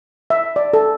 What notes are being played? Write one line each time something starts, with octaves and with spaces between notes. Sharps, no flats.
E5
D5
A4